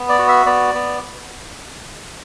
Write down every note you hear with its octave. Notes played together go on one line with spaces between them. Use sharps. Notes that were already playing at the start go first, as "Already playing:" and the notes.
Already playing: B3
D5
F#4
E5
B3 D5
B3